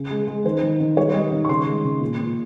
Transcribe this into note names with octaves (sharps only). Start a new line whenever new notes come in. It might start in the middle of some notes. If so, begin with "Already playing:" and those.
Already playing: C#3
G#3
G#3
D#3 C5
D#3
D#3
G3 C#5
G3 D#5
D#3
C#6
C#3 C6
G#3
C#3
A#2
A#2